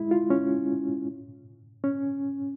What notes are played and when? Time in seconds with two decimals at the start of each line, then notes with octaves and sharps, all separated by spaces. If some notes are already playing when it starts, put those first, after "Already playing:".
Already playing: G#3 E4
0.11 F4
0.30 C#4
1.84 C#4